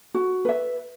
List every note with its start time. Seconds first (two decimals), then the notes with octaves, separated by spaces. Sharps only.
0.14 F#4
0.45 B4 E5